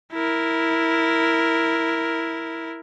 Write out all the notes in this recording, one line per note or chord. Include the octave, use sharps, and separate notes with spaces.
E4 A#4